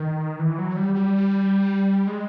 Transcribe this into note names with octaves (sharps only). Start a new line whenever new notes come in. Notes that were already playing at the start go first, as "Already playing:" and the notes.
Already playing: D#3
E3
F#3
G3
G3
G#3